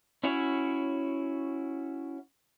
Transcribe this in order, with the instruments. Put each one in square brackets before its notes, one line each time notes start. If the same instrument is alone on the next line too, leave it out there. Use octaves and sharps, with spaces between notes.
[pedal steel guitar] C#4 E4 F#4 C#5